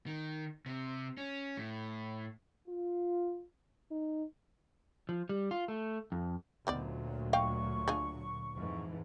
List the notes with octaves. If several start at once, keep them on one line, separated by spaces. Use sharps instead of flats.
D#3
C3
C#4
A2
F4
D#4
F3
G3
F4
A3
F2
D2 A#2 D#3 F#3 B3 D5
D#5 F5 G5 C#6
D4 F4 G#4
F2 G#2 E3